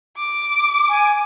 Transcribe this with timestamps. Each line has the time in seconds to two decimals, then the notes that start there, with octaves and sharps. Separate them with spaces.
0.17 D6
0.88 G#5